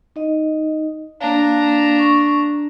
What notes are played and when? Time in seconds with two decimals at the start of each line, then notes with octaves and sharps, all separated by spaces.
0.16 D#4 D#5
1.21 A#3 D4 F5 A#5
1.99 C#6